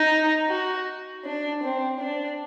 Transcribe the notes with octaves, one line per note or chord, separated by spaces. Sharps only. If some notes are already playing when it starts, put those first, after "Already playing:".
Already playing: D#4
F#4
D4
C4
D4